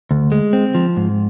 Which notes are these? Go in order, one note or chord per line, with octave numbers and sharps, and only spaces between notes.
D2
G#3
C4
F3
G#2